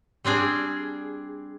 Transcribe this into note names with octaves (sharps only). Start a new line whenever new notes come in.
G3 C4 D4 G#4